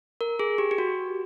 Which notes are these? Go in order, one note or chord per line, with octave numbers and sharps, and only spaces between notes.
A#4
G#4
G4
G4
F#4